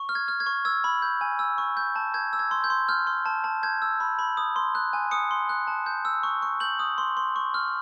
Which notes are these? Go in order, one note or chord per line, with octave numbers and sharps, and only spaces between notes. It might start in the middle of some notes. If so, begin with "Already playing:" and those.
Already playing: C#6
F6
G#6
F6
G#6
C#6
E6 G#6
B5
G6
G#5
E6
C#6
G6
A5
G6 G#6
E6
G#6
C6
G6
C6
F6 G6
C6
A5
A5
G6 G#6
E6
B5
B5
D#6
C6
F#6
G#5
D#6 C#7
C6
F#6
A5
G6
E6
C#6
C#6
G6 F#7
D#6
C6
C6
C#6
F6